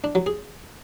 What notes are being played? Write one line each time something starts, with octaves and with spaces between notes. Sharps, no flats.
D4
F#3
G#4